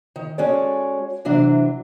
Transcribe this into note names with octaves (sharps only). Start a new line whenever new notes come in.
D#3
G#3 C#4 F#4 A4 C#5 D5
C3 E3 F#3 D4